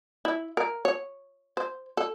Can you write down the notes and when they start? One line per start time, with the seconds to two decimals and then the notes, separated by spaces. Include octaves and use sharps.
0.25 E4
0.57 A#4
0.85 C#5
1.57 C5
1.97 A4